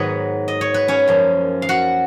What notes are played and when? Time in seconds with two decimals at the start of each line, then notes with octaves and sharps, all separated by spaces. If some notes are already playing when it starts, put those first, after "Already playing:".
Already playing: G#2 D#3 F#3 B3 B4 C#5 D#5
0.48 D#5
0.61 C#5
0.74 B4
0.88 C#4 C#5
1.08 F#2 F3 A#3
1.62 F5
1.69 F#4 F#5